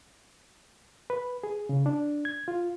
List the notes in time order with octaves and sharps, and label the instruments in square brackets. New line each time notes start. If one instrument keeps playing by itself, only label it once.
[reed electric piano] B4
G#4
C#3
D4
G#6
F4